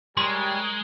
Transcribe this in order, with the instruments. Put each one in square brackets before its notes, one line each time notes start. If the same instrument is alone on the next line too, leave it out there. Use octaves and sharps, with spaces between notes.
[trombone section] G3 [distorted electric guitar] G#3 [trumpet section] A#4 C#5 G#5 [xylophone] C6